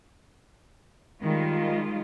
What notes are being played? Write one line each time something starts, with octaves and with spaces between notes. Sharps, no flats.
D#3 G3 G#3 F4